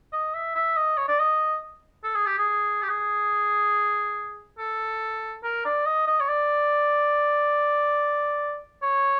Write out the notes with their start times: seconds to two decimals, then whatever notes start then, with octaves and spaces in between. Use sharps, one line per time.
0.13 D#5
0.34 E5
0.55 E5
0.77 D#5
0.97 C#5
1.08 D5
1.19 D#5
2.04 A4
2.15 G#4
2.26 G4
2.38 G#4
2.83 G4
2.89 G#4
4.58 A4
5.44 A#4
5.65 D5
5.86 D#5
6.07 D#5
6.20 C#5
6.28 D5
8.83 C#5